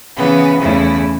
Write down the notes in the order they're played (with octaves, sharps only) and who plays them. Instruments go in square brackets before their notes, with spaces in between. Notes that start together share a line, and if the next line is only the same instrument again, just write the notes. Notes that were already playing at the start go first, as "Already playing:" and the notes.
[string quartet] C#3 E3 B3
E2 C#3 A3 E4